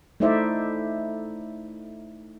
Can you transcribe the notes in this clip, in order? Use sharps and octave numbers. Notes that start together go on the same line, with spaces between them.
A3 D#4 E4 C5 D5 E5